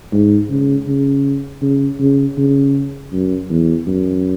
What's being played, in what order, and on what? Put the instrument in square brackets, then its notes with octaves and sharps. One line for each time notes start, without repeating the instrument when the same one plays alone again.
[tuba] G#2
C#3
C#3
C#3
C#3
C#3
F#2
E2
F#2